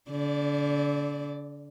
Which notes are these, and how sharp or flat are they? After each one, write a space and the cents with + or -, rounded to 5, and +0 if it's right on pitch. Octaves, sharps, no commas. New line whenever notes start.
D3 -35 D5 +0